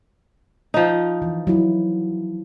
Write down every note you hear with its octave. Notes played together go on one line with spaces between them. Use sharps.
F3 D#4
E3
F#3 E4